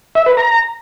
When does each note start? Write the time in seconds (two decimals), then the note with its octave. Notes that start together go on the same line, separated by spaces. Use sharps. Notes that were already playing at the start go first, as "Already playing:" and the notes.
0.15 E5
0.26 B4
0.37 A#5